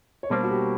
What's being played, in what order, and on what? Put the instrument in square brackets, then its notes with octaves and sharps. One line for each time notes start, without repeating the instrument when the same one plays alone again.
[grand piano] C#5
[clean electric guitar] B2 G3 A#3 D4 [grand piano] C5
[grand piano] F#4
G4